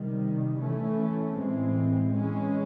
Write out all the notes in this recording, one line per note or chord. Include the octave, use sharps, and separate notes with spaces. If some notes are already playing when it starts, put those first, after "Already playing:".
Already playing: C3 D#3 G3
E3 A3 C#4
A2 E3 G#3 C4
E3 G#3 C#4